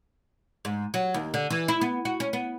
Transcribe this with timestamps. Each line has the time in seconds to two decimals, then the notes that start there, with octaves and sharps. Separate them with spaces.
0.65 G#2
0.94 F#3
1.14 D#2
1.34 D3
1.50 E3
1.68 E4
1.81 B3
2.05 F#4
2.20 C#4
2.33 B3